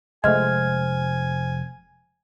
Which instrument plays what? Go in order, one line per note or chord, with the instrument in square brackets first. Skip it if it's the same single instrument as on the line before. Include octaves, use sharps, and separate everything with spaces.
[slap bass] F1 [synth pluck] G#3 A3 [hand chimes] C5 F6 G#6 [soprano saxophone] G#5